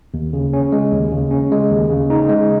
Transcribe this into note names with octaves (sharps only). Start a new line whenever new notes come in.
D#2
C#3
C#4
G#3
D#2
C#3
C#4
G#3
D#2
C#3
D#4
G#3